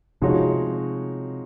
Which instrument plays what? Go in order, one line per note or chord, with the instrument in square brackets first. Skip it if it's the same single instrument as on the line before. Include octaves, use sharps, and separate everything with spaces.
[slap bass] C3 [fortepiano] F3 G#3 D#4 F#4 C#5